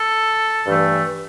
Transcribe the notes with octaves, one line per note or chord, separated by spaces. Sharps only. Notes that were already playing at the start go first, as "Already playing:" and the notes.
Already playing: A4
G2 E3 A3